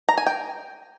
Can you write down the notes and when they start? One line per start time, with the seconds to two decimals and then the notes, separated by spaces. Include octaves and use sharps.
0.09 A#5
0.18 G#5
0.26 G5